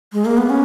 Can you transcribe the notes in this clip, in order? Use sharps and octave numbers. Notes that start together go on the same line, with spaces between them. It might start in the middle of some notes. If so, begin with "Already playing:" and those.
G#3
A#3
B3
C#4